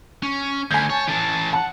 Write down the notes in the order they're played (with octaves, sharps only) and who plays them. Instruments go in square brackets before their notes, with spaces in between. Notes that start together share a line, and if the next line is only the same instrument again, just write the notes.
[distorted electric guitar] C#4
[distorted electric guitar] D2 [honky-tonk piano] G#5 G6 [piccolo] G#6
[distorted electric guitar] C#5 [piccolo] A5
[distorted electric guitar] E3 C#4 [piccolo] A5
[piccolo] F#5 [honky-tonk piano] A5